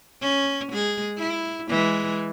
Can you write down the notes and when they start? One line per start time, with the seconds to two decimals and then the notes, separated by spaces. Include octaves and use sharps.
0.21 C#4
0.73 G#3 G#4
1.18 E4
1.69 E3 G#3